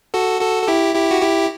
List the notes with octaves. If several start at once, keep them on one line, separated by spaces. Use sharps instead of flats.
F#4 A4
F#4 A4
A4
E4 G4
E4 G4
F#4
E4 G4